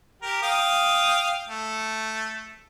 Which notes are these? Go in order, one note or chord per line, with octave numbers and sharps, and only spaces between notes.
G4 A#4
F5 G5 D#6
A3